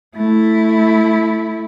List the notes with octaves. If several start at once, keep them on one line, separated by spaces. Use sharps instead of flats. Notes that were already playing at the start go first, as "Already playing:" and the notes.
A3 E4